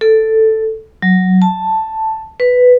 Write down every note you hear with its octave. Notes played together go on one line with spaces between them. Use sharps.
A4
F#3
A5
B4